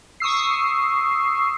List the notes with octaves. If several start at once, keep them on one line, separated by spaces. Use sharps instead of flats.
C#6 D#6 E6 C7